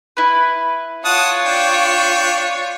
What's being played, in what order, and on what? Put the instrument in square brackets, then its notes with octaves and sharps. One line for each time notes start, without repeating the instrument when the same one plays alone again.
[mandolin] E4 B4
[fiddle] F4 C#5 [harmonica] F#5 A5 D#6
[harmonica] D4 G5